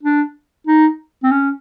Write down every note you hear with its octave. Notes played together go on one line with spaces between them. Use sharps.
D4
D#4
C4
C#4